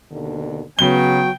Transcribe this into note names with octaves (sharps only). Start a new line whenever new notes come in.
D#2 B2 D3
C#3 F#3 B3 G5 G7